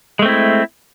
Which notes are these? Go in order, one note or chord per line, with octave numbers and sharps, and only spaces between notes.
G#3 A3 C4 E4